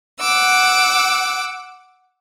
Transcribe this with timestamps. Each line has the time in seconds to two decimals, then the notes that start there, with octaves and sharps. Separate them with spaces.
0.19 F#5 D6 E6